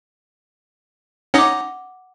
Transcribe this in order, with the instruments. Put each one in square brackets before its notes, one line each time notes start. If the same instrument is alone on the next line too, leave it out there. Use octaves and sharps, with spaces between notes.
[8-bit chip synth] C#4 D#4 D#5 [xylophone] F#5 D6